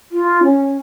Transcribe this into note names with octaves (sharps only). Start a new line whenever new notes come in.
F4
C#4